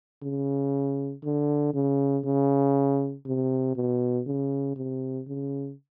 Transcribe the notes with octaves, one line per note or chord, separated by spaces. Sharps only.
C#3
D3
C#3
C#3
C3
B2
C#3
C3
C#3